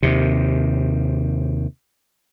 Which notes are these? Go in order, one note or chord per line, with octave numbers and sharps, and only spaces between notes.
D#2 C3